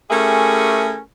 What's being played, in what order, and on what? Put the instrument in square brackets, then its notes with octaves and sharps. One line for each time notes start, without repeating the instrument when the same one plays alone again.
[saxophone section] A3 C#4 E4 G4 G#4 A#4